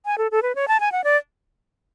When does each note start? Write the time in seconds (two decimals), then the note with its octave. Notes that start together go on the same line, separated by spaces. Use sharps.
0.06 G#5
0.18 A4
0.31 A4
0.43 B4
0.55 C#5
0.68 A5
0.80 G#5
0.92 F#5
1.04 D5